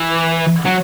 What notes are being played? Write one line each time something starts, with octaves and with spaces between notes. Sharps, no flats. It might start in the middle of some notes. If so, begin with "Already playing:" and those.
Already playing: E3
F#3